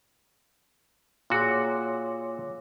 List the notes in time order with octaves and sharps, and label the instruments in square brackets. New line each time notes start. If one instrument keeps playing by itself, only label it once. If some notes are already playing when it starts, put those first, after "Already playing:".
[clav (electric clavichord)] A#2 F#4 [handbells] F4 G#4 [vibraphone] C#5 D6 E6